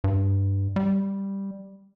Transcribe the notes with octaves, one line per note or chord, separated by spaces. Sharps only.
G2
G3